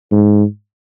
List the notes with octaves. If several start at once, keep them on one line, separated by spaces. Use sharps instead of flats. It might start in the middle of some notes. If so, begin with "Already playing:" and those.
G#2